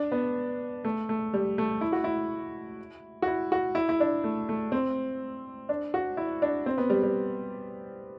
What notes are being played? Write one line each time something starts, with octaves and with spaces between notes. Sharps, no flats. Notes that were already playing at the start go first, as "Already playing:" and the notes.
Already playing: D4
B3
A3
A3
G3
A3
E4
F#4
E4
F#4
E4
F#4
E4
E4
D4
A3
A3
C4
D4
F#4
E4
D4
C4
B3
G3
G3